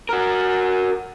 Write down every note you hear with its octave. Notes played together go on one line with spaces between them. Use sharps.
F#4 A#4